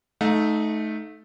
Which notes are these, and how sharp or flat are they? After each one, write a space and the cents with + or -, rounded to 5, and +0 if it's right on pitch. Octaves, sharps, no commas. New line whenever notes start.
A3 -20 D#4 +0 F5 +35